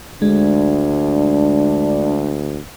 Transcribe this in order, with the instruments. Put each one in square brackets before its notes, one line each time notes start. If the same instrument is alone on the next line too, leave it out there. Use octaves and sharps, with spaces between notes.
[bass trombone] D2 [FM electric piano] G#3 [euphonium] D4